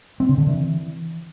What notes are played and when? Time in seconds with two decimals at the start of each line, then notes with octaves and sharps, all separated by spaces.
0.20 C4
0.29 C#3
0.38 D3
0.47 E3